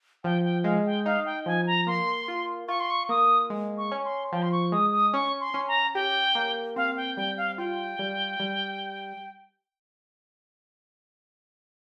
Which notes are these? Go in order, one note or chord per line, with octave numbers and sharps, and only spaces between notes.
F3 G5
G5
G#3 F5
G5
D#4 F5
G5
F3 G#5
A#5
A#3 C6
F4
F4 C#6
C6
C#6
A#3 D#6
G#3
C#6
C#4
C6
F3 G5
C6
C#6
G#3 D#6
D#6
C#4 C#6
C6
C#4
A#5
G4 G5
A#3
C4 F5
G5
G3 G5
F5
F4 G5
G3
G3